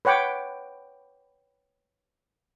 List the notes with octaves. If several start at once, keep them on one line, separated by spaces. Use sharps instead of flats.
B4 C#5 F#5 G5 D6